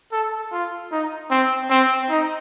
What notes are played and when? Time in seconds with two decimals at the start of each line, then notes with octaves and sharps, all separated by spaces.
0.12 A4
0.52 F4
0.92 D#4
1.31 C4
1.70 C4
2.10 D#4